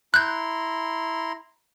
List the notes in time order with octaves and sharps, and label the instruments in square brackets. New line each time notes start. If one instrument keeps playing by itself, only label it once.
[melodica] E4 A#5 C6 [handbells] F#6 G6